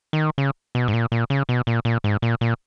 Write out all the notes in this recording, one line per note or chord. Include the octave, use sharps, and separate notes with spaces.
D#3
C#3
B2
G#2
A#2
A#2
C#3
B2
A#2
A#2
G#2
A#2
A#2